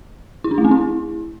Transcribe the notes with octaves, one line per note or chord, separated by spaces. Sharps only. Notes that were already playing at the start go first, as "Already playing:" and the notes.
E4
D4
A3
C4
E4